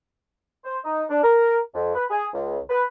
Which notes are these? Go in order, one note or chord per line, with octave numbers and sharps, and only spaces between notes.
C5
D#4
D4
A#4
F2
B4
G#4
C#2
B4